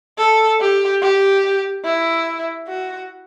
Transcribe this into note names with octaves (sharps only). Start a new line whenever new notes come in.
A4
G4
G4
E4
F#4